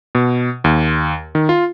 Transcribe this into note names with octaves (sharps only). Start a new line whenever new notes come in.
B2
D#2
D#3
F4